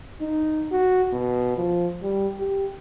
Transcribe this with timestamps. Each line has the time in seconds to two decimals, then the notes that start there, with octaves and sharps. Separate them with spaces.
0.21 D#4
0.72 F#4
1.13 B2
1.58 F3
2.03 G3
2.40 G4